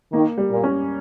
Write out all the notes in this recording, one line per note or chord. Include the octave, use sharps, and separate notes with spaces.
D#3 A#3
G3
A#2
C#4